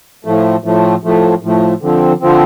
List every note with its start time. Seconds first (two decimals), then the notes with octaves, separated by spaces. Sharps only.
0.25 A2 F3 A3
0.64 A2 F3 A3
1.04 A2 F3 A3
1.43 A2 F3 A3
1.82 D3 F3 C4
2.21 D3 F3 C4